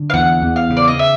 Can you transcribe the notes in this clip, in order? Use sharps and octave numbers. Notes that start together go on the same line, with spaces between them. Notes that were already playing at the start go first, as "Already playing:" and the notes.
Already playing: D3
F5
E2 F#5
E2
F5
C#3
D5
D#5
E5